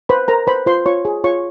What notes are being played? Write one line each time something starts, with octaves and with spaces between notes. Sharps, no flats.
B4 C5 B5
A#4 C5 A#5
B4 C5 B5
F4 C5 C6
F4 C#5 C#6
G#4
F4 C#5 C#6